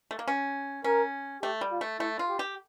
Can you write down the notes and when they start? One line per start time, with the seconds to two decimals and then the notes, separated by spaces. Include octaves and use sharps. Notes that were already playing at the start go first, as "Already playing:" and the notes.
0.11 A3
0.19 A#3
0.28 C#4
0.84 C#4 A#4
1.42 A3 G4
1.61 G3
1.71 F4
1.81 A3
2.00 A3 E4
2.19 F4
2.29 G4
2.39 G4